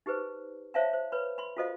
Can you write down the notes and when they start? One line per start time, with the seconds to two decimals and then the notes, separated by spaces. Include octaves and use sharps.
0.06 D#4 G4 G#4 B4 C5
0.74 C5 C#5 E5 F5 A5 A#5
0.93 C5
1.12 B4 C#5 B5
1.38 B5 C6
1.57 F4 F#4 A4 C5 D#5 F5